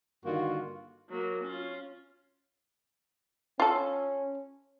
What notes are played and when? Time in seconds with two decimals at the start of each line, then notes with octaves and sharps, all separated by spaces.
0.25 G2 D3 D#3 A#3 F4 F#4
1.09 F#3 A#3
1.43 C#4 F4
3.60 C#4 F4 A4